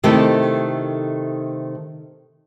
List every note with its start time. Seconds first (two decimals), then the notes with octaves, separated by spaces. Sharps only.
0.03 C3 D#3 A3 D#4 E4 A4